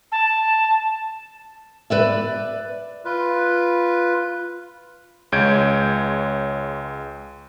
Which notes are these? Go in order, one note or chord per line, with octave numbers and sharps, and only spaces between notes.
A5
B4 D5 E5
F4 B4
C#2 G#3 C#5 G6 G#6 D7